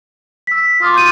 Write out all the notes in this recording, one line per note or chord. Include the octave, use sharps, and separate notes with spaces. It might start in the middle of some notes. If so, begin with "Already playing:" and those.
E6 B6
F4 D6 D#6
G6 D#7